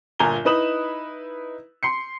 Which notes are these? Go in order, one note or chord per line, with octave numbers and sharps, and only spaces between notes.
G1 A#2 G#5 A#5 G7
D#4 E4 B4 D#6 E7 F#7
C6 C7 C#7